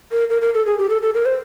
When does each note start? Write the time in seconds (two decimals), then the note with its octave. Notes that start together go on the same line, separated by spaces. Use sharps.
0.12 A#4
0.30 A#4
0.42 A#4
0.54 A4
0.66 G#4
0.78 G4
0.89 A4
1.02 A4
1.14 A#4
1.26 C5